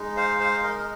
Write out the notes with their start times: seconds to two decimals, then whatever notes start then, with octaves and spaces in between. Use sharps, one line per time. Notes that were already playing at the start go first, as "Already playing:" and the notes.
Already playing: G#3 D#4
0.17 C5 F5
0.40 C5 F5
0.63 A#4 D#5
0.79 D#5